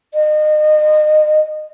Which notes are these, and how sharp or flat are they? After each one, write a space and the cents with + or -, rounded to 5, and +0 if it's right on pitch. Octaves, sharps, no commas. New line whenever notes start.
D#5 -30